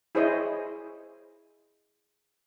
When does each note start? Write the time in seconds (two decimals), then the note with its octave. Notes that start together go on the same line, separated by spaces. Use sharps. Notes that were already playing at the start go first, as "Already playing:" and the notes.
0.15 E4 G#4 C5 C#5 D#5